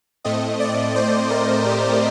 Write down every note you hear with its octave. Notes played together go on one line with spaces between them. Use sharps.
A2 A3 C4 D#5
D5
C5
A#4
G4